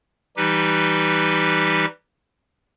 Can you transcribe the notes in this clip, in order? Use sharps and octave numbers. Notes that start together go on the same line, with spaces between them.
E3 G3 D#4 G4 B4